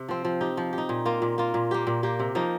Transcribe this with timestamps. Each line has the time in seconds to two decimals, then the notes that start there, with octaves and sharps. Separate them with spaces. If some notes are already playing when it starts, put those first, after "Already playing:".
Already playing: C3
0.08 F3 C4
0.25 F3
0.41 D#4 G4
0.57 F3
0.73 G4
0.78 D#4
0.89 A#2
1.05 A#3 F4
1.22 A#2
1.38 A#3 F4
1.54 A#2
1.71 A#3 G4
1.87 A#2
2.03 A#3 G4
2.19 C3
2.35 F3 A#3 D#4